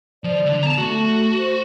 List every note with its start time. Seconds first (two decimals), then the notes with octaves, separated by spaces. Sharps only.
0.24 F3 D5
0.46 D3
0.63 B3 A5 A#5
0.78 A3 F#4
1.38 C5